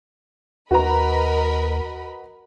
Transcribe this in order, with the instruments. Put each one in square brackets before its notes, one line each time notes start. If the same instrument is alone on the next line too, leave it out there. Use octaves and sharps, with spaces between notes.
[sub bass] D#2 [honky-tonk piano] F#4 B4 A#5 [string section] A#4 D#5 B5